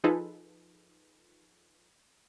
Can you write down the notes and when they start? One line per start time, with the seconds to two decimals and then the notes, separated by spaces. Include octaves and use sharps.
0.04 F3 D#4 F4 G#4 A4 B4